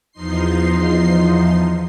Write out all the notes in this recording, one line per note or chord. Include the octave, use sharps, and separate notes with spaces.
E2 F3 D#4 C6 C7